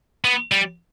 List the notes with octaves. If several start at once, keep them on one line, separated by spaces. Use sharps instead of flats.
B3
G3